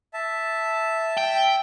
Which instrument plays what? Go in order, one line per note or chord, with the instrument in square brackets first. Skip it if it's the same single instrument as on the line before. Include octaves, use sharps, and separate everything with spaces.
[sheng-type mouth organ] E5 A5
[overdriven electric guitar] G5